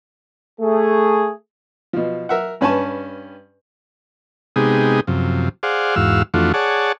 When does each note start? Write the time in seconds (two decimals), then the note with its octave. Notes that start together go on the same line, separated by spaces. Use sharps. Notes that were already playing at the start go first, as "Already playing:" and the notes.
0.61 A3 G#4
1.93 B2 F3
2.29 A#4 E5 F#5
2.61 G2 C#4 B4 G#5 A5 C#6
4.56 C3 G#3 B3 D#4 G4 G#4
5.07 F#2 C3 F3
5.63 G#4 C5 D5 F5 F#5
5.96 E2 G#2 F#4 F5 E6
6.34 F2 E3 A3 D4 F4 F#4
6.54 G#4 C#5 D5 F#5 A5